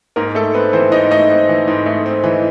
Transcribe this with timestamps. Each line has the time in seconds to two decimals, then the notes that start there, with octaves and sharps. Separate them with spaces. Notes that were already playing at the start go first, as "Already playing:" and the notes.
0.16 G#2 A#3 A#4
0.35 A3 A4
0.54 B3 C4 B4
0.73 E3 C4 C5
0.92 G#2 D#4 D#5
1.11 A3 D#4 D#5
1.29 C4
1.49 E3
1.68 G#2
1.86 A3
2.06 C4
2.24 E3